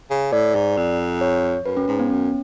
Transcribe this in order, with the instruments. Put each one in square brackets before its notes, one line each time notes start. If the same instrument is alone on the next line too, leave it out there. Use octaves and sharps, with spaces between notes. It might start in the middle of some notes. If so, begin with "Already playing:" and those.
[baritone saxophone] C#3
[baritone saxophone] A2 [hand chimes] D5
[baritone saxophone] G#2
F2
[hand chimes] C#5
[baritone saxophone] F#2 [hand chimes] B4
[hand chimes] C#4
[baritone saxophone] G#2 [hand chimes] C#4
[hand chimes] B3
[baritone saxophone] F#2 [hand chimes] C#4